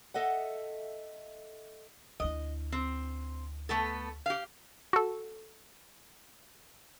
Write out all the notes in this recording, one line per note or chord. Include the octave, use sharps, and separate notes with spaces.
A4 D#5 E5 F#5
D2 E4 D#5
C4
A3 B3 A4
G4 F5
F#4 A4